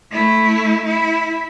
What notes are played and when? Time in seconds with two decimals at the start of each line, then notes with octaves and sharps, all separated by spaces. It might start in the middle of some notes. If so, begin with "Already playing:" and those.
0.12 A3 E4
0.86 E4